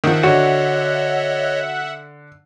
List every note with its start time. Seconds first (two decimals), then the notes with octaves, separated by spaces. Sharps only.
0.04 D#3 F3 E5 F#5
0.23 D3 F#4 C#5 D#5